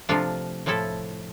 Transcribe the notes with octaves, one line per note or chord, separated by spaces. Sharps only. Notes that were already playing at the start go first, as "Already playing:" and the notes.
C3 F3 A3 D4 F4
A2 F3 A3 E4 A4